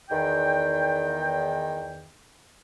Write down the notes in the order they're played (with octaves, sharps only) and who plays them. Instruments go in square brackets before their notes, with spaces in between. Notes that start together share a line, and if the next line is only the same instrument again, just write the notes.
[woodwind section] E2 D#3 G5